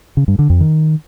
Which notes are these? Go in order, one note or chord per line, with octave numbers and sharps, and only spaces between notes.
C#3
G2
D3
F2
D#3